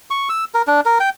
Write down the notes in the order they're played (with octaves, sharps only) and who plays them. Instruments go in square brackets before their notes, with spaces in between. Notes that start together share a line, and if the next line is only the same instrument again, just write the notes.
[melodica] C#6
E6
A#4
D4
A#4
G5